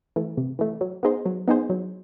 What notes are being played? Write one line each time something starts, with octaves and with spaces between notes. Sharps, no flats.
E3 A3
C3
E3 A3
F#3
B3 D#4 G#4 C5
F#3
B3 D#4 G#4 C5
F#3